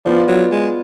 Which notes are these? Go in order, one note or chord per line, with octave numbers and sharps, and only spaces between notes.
F3 B3 F4 B4 D5
F#3
G#3